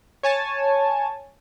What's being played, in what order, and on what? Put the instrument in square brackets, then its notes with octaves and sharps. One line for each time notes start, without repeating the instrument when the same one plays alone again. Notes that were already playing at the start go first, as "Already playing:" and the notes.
[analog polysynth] C#5 G#5 A5